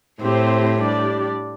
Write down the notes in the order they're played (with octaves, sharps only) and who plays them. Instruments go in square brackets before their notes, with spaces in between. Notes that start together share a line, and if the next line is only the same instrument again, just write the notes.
[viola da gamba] A2 [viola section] C4 G4 C5
[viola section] G3 D4 G4 D5